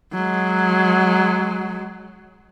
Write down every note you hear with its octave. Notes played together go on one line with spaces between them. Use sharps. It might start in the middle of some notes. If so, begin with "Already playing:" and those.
F#3 G#3